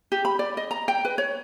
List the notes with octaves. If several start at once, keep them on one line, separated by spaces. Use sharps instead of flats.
G4
B5
D5
D#5
A#5
G5
B4
C#5